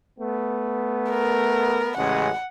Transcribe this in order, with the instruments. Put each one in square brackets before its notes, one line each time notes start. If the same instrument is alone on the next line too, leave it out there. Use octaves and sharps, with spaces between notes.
[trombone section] A3 B3
[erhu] A#4
[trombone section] A1 C#3 G#3 [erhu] F#5